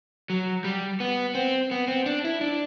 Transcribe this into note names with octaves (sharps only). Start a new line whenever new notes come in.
F#3
G3
B3
C4
B3
C4
D4
E4
D4